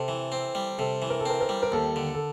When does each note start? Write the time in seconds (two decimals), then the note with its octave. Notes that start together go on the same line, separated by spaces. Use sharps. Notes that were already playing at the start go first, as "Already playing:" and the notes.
Already playing: C3 A4
0.08 E3
0.32 C4
0.55 G3
0.78 C3 A4
1.02 E3
1.10 A#4
1.20 A4
1.26 C4 A#4
1.41 A#4
1.49 G3
1.63 A#4
1.72 D#2 A4
1.96 D3
2.14 A4